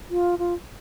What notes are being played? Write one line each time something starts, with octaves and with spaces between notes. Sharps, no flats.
F4
F4